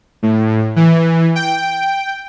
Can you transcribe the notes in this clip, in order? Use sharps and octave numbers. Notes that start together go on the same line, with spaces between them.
A2
E3
G5